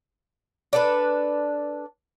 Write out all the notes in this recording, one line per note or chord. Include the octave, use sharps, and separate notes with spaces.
D4 A4 B4